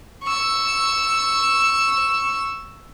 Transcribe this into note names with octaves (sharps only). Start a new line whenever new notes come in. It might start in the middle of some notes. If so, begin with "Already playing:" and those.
C#6 E6